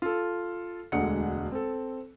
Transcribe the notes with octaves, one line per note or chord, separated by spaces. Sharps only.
F4 A4
E1 D2 D3 G#3 F#5 C#7
C4 A4